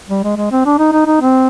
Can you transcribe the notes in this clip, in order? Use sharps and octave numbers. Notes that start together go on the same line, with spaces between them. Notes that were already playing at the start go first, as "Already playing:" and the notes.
G3
G#3
G#3
C4
D4
D#4
D#4
D#4
C4